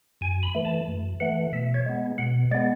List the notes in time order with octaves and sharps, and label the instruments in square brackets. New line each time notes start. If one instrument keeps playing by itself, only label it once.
[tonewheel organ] F#2 G#5
B5
E3 A3
A5
F#2
E3 A3 F#5
B2 E5
C#5
G#3 B3
B2 F#5
G#3 D5
B3